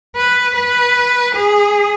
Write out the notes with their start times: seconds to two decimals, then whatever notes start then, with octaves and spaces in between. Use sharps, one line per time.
0.16 B4
0.55 B4
1.36 G#4